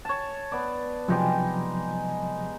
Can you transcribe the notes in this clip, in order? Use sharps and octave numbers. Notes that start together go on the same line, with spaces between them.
C#5 A5
B3 D5
C3 F3 F#3 G#3 D#4 G4